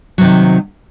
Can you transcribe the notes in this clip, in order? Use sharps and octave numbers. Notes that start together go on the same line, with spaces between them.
C3 D#3 F#3